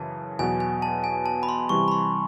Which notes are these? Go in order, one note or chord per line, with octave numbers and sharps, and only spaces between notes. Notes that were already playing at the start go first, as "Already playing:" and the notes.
Already playing: F#2 C#3 E3 A5
E2 B2 F#3 B3 G#5
G#5
A5
G#5
A5
B5
C6
C3 E3 G3 C#6
B5
C6